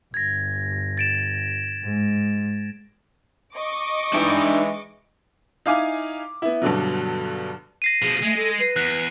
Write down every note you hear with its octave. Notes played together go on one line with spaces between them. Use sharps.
G1 G#6 A#6
A6 D7 E7
G#2 G#3
D#5 C#6 D6
E3 G#3 D4 D#4 E5 G5
D#4 E4 F5 G#5 D6
B3 E4
G2 B2 D3 F#3
A#6 C7 D#7
B2 F3 G#4
G#3 A3
A4
B4
E2 F#6